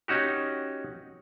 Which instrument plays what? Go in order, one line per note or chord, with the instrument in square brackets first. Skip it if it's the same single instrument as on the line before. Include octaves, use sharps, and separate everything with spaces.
[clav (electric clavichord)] C#4 D#4 F#4 G4